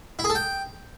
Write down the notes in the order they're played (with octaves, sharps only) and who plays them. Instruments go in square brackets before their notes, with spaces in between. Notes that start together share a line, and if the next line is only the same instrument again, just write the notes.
[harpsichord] E4
G#4
A4
G5